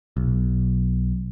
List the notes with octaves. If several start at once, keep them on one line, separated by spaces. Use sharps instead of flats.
B1